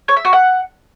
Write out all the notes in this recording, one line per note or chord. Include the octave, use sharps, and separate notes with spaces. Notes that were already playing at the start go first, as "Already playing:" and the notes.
C#5
E5
F#4
F#5